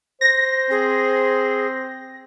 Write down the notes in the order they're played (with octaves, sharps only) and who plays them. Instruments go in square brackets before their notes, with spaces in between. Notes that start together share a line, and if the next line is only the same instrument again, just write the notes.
[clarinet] C5 [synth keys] A#6
[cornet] C4 [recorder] G#4